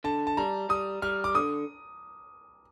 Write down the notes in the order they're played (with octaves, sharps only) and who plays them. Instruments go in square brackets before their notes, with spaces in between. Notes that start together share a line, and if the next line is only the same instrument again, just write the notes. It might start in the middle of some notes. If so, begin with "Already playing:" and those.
[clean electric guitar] D3 [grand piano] A5
[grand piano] A5
[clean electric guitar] G3 [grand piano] A#5
[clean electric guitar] G3 [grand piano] D#6
[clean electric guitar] G3 [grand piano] F6
[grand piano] D6
[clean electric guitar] D3 [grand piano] D#6